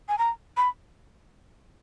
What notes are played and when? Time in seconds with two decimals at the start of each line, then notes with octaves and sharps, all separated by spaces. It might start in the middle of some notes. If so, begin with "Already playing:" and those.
0.09 G#5
0.18 A#5
0.57 B5